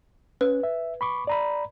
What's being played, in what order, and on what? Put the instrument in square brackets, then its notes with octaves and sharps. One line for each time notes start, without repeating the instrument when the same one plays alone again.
[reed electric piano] C#4 [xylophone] B4
[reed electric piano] E5
B5 C#6 D6
D5 A#5 B5